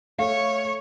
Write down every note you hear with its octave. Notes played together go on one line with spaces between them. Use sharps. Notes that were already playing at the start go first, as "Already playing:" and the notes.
A3 C#5 F5